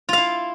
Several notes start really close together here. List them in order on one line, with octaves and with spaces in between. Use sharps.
F4 F5 E4